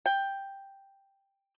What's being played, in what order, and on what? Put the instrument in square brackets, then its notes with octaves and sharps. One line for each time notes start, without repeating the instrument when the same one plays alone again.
[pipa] G5